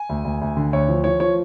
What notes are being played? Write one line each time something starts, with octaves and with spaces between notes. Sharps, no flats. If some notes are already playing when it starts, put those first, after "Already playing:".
Already playing: G#5
D2
D2
D2
D3
D2 C#5
F3
F3 C#5
F3 C#5